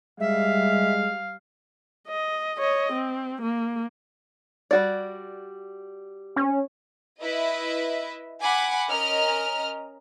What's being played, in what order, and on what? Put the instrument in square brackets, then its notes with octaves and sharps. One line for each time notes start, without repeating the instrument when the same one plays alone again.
[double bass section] G3 [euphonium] G#3 [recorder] E5 [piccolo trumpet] F5
[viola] D#5
C#5 D#5
C4
A#3
[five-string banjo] G3 F#4 D5
[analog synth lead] C#4
[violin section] E4 B4 D#5 E5
F#5 G#5 B5 D6
C#4 A#4 D#5 F6